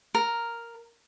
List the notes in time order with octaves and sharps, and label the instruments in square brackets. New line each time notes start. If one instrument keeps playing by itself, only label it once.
[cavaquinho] A#4